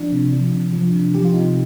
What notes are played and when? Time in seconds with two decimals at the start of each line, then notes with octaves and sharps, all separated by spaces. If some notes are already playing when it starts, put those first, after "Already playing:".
Already playing: F3 D4
0.12 C3
0.33 F3
0.52 C3
0.73 F3
0.93 C3
1.14 F3 G4
1.25 F4
1.33 C3 D#4